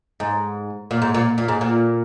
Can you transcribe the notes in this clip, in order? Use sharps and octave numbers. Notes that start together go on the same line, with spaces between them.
G#2
A#2
G#2
A#2
A#2
G#2
A#2